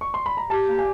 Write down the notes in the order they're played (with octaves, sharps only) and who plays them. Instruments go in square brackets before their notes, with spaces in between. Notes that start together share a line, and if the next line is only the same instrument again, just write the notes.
[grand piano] C#6
C6
B5
A#5
[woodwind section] G4 [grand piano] A5
[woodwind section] A#3
[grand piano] G#5